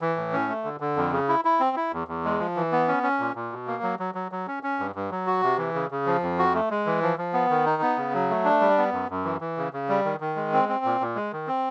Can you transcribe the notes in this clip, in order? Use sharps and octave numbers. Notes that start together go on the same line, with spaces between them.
E3
A2
C#4
A3
D3
D3
F2
C#3
E4
E4
C4
E4
E2
E2
G#3
F3
E3
B3
C#4
C#4
A#2
A#2
B2
A#3
F#3
F#3
F#3
F#3
C#4
C#4
G2
G2
F#3
F#4
C3
E3
C#3
C#3
F3
F2
F#4
A3
G#3
E3
F3
F3
B3
D#3
D#4
B3
C#3
F#3
A3
D4
G3
B3
F#2
F#2
E3
E3
C#3
C#3
G3
D#3
D#3
G#3
C4
C4
A#2
A#2
G#3
D#3
C4